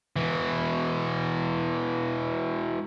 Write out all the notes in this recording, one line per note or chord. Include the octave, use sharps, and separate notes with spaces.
B2 E3